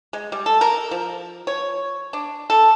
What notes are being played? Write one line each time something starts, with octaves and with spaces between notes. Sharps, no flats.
G#3
G3
A4
A#4
F3
C#5
D4
A4